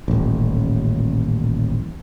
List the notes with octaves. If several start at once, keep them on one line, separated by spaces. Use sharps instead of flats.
D#1 A1